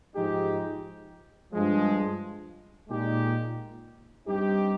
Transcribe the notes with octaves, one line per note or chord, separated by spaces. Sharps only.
G#2 F3 G#3 D#4 G4
G2 F3 G#3
A#2 G#3 D#4 G4
G2 G3 C4 D#4 G4